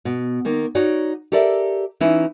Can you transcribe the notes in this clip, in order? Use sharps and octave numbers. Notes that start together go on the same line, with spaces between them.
B2
D#3 A#3
D#4 F#4 C#5 D5
G4 A4 A#4 D5 E5
E3 C#4 D#4 E4